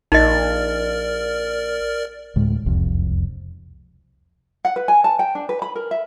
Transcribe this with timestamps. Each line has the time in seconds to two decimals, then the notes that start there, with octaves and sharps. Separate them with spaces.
0.12 A#1 D#4 A#4 D5 D#5 F6
2.36 D2 A2 G#3
2.66 E1 C2 F2
4.65 F#5
4.76 B4
4.88 G#5
5.04 A5
5.19 G5
5.35 D4
5.49 B4
5.62 B5
5.76 A#4
5.91 E5